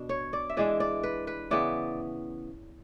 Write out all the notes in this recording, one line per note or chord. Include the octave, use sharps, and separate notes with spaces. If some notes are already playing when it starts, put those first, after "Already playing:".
Already playing: B2 D4
C#5
D5
E5
E3 G#3 D4 D5
D5
B4
B4
C#3 E3 B3 D5